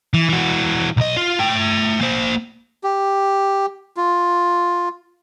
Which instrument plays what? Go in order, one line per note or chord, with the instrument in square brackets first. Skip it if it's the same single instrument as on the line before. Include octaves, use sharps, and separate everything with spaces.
[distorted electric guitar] E3
E3 F#4
B1 D#5
F4
A3 G5
A#3 C5
[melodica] G4
F4